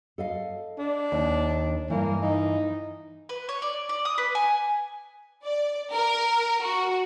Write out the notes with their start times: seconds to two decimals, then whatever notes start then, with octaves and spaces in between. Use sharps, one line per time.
0.18 A4 D#5 F5
0.78 D4
1.12 D#2
1.90 G2 E3 A#3
2.22 D#4
3.29 B4
3.49 C#5
3.62 D5
3.89 D5
4.05 D#6
4.18 B4
4.35 G#5
5.45 D5
5.95 A#4
6.65 F#4